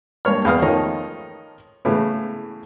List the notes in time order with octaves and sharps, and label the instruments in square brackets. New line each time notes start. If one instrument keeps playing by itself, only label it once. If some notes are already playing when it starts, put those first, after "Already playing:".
[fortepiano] G2 A#3 C#5 F6
E2 B4 F5 D#6 F6
D#3 F3 A3 C#4 D#4
A2 C#3 E3 B3